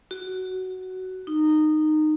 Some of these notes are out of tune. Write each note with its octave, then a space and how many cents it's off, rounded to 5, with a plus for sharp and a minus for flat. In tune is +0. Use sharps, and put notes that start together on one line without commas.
F#4 +10
D#4 -15